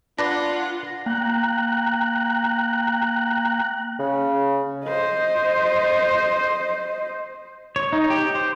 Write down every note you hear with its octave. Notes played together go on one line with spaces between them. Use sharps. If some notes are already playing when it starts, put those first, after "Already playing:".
D4 F4 B4 D5 F#5 A#6
A#3 G5 A#5 F#6
C#3
C5 D#5
C#5
D#4
G4
C5